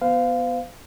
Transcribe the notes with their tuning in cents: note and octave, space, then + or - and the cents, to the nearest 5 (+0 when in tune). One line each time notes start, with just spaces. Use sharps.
B3 +0 C5 -45 F5 +0